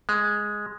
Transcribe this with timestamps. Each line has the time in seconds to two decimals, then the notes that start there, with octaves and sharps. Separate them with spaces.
0.09 G#3